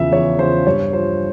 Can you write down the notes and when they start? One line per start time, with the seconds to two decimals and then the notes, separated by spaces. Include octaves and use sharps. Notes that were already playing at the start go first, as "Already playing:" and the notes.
Already playing: E2 C#3 F3 E5
0.11 E2 C#5
0.39 C#3 F3 C5
0.66 G2 C#5
0.93 F3 C5